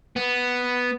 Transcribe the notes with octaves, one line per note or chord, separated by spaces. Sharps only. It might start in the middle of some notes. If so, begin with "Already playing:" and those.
B3